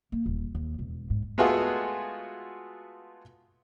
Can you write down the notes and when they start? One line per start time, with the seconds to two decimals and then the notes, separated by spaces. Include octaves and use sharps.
0.12 A#3
0.26 D#1
0.55 D#2
0.79 E1
1.10 G#2
1.38 G#3 A3 B3 F4 F#4 G#4